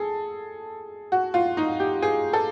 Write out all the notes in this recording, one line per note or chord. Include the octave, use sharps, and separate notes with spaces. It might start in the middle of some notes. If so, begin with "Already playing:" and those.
Already playing: G#4 A4
F#4
F4
D#4
G4
G#4
A4